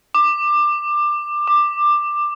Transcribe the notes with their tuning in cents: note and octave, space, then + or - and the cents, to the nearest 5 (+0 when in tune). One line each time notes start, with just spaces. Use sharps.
D6 +20
D6 +15